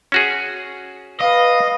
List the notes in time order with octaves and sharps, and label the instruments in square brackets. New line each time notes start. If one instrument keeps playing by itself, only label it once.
[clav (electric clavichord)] C#4 F#4 G#4
[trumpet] B4 [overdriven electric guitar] D#5 [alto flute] F5